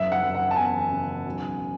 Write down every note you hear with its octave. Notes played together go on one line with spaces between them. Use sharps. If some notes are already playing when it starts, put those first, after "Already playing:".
Already playing: F#1 E5
F#5
F#1
F#5
A5
E2 G#5
C#3
B1